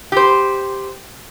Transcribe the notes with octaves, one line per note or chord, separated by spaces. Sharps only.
G4 C5